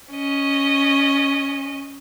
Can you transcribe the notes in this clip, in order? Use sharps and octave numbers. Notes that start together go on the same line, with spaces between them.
C#4 D#5